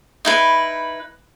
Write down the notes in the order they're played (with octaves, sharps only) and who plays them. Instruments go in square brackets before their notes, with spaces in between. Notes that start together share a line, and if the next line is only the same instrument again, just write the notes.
[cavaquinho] D#4 E4 B4